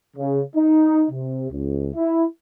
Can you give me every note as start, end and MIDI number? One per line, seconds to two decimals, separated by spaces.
0.17 0.40 49
0.56 1.05 63
1.11 1.48 48
1.51 1.90 37
1.95 2.24 64